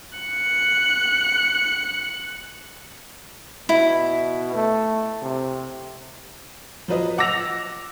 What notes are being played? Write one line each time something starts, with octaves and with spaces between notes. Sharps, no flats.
F#6 C#7
B2 E4
A3
C3
F3 F#3 B4 D#5
F#5 D6 E6 A#6 F7